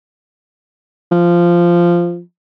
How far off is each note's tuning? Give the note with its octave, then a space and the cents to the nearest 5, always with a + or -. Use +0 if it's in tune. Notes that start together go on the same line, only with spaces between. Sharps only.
F3 -10